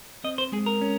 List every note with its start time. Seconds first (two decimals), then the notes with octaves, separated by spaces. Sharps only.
0.24 C4 D#5
0.38 C5
0.52 G#3 G#4
0.66 A#4
0.81 C#4